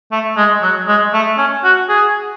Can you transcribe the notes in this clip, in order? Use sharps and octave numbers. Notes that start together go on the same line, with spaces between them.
A3
G#3
F#3
G#3
A3
C#4
F#4
G#4